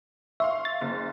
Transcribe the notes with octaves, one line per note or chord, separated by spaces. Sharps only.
E5 F5 C6 C#6
A6
F#1